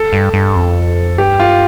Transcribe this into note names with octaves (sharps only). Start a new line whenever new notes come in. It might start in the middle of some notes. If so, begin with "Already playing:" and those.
Already playing: A4
G2
G2
F2
G2 G4
F4